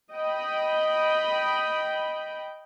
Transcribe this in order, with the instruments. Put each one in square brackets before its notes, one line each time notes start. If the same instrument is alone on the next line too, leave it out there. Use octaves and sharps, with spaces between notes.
[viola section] D#5 G5 B5